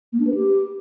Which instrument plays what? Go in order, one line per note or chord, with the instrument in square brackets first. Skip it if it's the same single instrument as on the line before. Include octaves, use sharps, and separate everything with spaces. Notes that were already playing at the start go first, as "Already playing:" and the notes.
[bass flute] A#3
D4
B4
G4